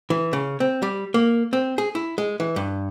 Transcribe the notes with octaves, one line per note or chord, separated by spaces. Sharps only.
E3
C#3
C4
G3
A#3
C4
G#4
E4
G#3
E3
G2